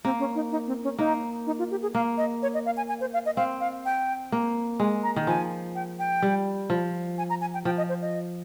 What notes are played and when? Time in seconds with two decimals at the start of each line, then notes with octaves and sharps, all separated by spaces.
0.05 A#3 C4
0.19 C#4
0.35 D#4
0.51 D#4
0.67 C4
0.84 C#4
0.99 A#3 D#4
1.47 D#4
1.59 F4
1.71 G4
1.82 G#4
1.94 A#3 F5
2.18 D#5
2.42 C#5
2.54 D#5
2.66 F5
2.77 G#5
2.89 G#5
3.01 C5
3.14 F5
3.26 D#5
3.36 C4 F5
3.60 F5
3.85 G5
4.32 A#3
4.80 G#3 G#5
5.03 A#5
5.16 D#3
5.27 F3 G#5
5.75 G5
5.99 G5
6.22 G3
6.70 F3
7.18 G#5
7.30 A#5
7.41 G#5
7.54 G5
7.65 F3 G5
7.78 D#5
7.89 C5
8.02 D#5